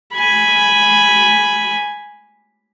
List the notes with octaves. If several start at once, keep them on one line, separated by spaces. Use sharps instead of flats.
G#5 B5